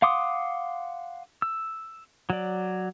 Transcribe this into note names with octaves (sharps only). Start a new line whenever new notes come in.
F5 F#5 C6 D6 D#6
E6
F#3 D5